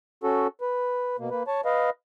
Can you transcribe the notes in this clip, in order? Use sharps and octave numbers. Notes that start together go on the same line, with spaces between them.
C#4 F#4 A4
B4
B2 A#3
A#3 B4
C#5 A5
B4 D#5 F5